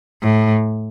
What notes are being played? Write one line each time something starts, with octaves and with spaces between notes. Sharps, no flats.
A2